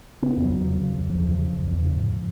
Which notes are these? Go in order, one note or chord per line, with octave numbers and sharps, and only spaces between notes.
C#3 B3
E2
F#3
E2
C#3
C#3
E2
E2 F3
E2
C#3
E2
E2
C#3
G#2